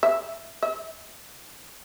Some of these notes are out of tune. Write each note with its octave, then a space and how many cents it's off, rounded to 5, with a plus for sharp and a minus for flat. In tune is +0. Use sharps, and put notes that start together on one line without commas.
E5 +15
E5 -30